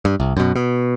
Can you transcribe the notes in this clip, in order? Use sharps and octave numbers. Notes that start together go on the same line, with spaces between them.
G2
C2
F#2 B2
B2